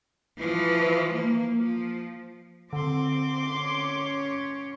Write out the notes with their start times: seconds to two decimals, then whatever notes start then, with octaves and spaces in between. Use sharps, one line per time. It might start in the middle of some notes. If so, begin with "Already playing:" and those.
0.38 E3 F3
1.13 A#3
1.57 F3
2.73 D3 C4 C6 D6
3.52 C#4 C#5